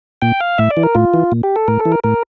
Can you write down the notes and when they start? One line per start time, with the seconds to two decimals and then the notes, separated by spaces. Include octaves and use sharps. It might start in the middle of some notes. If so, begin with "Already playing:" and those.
0.22 A#2 G5
0.40 F5
0.58 A2 E5
0.70 D5
0.77 E3
0.83 A#4
0.95 A2 F4
1.14 E3
1.32 A#2
1.43 G4
1.56 A4
1.68 A2 A#4
1.80 A4
1.85 E3
1.92 A#4
2.04 A2 A#4